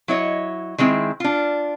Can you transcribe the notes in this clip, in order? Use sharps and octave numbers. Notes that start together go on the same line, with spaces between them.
F#3 E4 C#5 D#5
D#3 G#3 C4 E4
D4 F4